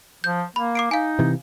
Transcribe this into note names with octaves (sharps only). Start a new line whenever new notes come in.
F3 G6
A#3 B5
D6 C7 D7
D#4 F5 G#5
C3 E3